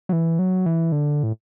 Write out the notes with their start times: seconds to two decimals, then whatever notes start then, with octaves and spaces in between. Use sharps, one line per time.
0.09 F#3
0.13 E3
0.39 F#3
0.66 E3
0.92 D3
1.23 A2